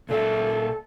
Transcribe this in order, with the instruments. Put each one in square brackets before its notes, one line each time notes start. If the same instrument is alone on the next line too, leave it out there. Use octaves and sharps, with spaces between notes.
[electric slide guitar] A#2 D5 E5 [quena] A4